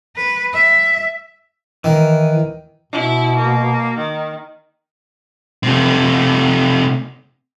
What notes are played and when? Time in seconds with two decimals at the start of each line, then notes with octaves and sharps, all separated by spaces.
0.16 B4
0.54 E5
1.84 D#3 E3
2.93 B2 E4
3.36 A#3
3.97 D#3
5.63 C3 A3